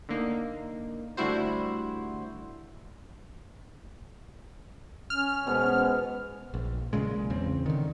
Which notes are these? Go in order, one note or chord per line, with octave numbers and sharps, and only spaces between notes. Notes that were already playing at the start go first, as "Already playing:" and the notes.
D3 A#3 D#4
D3 G3 A3 E4 F#4 C5
C#4 F6
B2 G#3 B3 C5
A#1
B1 A#2 C#3 G#3
E2 C#3 C4
D3 D#3